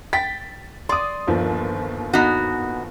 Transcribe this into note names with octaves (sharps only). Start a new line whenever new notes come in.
G5 A6 B6
D5 C6 D#6
G1 D#2 F3
B3 D#4 F#4